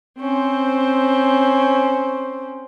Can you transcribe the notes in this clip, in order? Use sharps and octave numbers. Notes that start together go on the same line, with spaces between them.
C4 C#4 C5